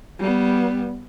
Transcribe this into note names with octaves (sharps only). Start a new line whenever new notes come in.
G3 B3